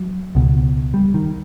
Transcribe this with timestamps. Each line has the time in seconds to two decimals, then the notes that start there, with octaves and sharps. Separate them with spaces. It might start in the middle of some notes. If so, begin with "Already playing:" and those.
Already playing: F#3
0.35 C#2 B2
0.94 G3
1.14 D#3